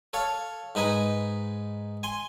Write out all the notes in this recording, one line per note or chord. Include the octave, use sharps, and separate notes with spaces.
A4 C#5 F5
G#2 D#4 B4 G#5
G#5 C6